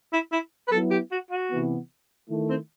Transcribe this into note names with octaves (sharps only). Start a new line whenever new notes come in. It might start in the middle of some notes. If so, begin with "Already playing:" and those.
E4
E4
B4
F#3 B3 E4 A4
G4
F#4
F#4
C3 E3 B3
D#3 A3 E4
C4